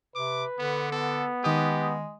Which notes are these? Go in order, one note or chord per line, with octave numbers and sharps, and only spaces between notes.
C3 B4 D6
D3 B3
B3 A4
D#3 G#3 G4 D#6